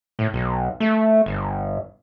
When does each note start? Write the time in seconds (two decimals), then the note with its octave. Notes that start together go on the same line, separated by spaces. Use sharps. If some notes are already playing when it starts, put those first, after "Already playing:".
0.19 A2
0.34 B1
0.80 A3
1.26 G1